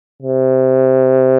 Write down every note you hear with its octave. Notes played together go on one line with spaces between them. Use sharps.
C3